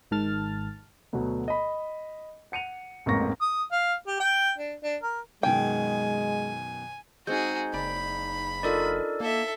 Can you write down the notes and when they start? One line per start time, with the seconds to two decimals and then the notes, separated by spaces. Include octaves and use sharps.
0.11 G#1 G#2 D#3 A5 F6 A6
1.13 D2 B2 F#3 B3
1.48 D#5 B5
2.52 F#5 C#7 D#7 F7
3.06 A1 F2 G#2 A#3 C#6 A#6
3.41 D#6
3.72 F5
4.07 G4
4.20 G5
4.58 D4
4.84 D4
5.03 A#4
5.43 F#2 B2 D#3 G#3 G5 G#5
7.27 G#3 C4 D#4 F#4 G#4 G6
7.74 F#1 D5 B5
8.63 D4 D#4 F4 A4 A#4 D5
9.20 A#3 A4 E5